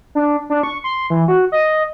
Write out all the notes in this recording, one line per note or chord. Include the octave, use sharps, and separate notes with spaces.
D4
D4
C#6
C6
E3
F#4
D#5